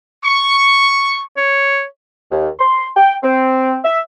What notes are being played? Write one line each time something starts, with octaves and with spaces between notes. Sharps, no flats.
C#6
C#5
D#2
C6
G5
C4
E5